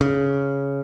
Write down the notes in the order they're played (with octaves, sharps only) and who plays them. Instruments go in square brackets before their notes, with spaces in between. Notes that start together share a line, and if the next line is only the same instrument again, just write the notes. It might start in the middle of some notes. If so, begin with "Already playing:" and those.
[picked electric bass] C#3